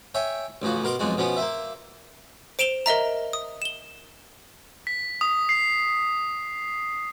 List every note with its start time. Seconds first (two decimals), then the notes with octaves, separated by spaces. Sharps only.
0.15 C#5 E5 G5 G#5
0.62 A1 C#3 F3 F#4
0.84 B2 A#4 C6 D6
0.99 B1 F2 G#3 F#4
1.17 B2 F3 B3 C#4
1.37 A#3 C5 E5
2.59 C5 D7 E7 F7 G7
2.86 A#4 D#5 E5 A#5
3.33 D#6
3.62 E7 G7
4.87 B6
5.21 D#6
5.49 C7